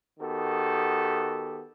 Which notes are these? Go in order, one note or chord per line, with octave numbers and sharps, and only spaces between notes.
D#3 B3 F#4 G4 A4